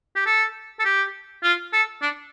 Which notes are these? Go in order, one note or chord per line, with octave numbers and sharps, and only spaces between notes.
G4
A4
A4
G4
F4
A4
D4